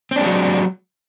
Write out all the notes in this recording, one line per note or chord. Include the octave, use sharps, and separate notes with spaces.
F#3 G#3 C4 D4